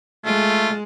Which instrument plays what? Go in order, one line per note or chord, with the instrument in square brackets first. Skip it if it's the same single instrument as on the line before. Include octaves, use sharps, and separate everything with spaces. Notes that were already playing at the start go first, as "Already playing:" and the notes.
[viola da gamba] G#3 [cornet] A3 [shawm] F4